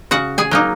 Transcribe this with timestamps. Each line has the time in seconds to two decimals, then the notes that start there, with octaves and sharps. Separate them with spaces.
0.11 C#3 F#4 F#5
0.38 G#4 G#5
0.51 F#3 A#3 D#4